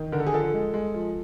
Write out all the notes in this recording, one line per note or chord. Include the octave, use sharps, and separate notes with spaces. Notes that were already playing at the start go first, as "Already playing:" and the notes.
Already playing: D#3
D3 A#4
A4
G#4
F3 A4
G#3
G#3
F3